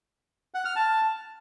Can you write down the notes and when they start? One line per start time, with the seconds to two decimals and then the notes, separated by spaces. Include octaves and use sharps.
0.54 F#5
0.65 F6
0.76 A5